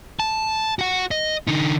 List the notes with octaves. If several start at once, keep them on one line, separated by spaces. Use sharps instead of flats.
A5
F#4 F#5
D#5
D3 D#4